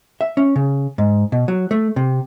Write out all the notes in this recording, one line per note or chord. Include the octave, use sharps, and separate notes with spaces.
E5
C#4
C#3
G#2
B2
F#3
A3
C3